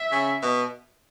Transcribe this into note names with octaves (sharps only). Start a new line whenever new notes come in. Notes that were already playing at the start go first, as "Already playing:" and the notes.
Already playing: E5
C#3
B2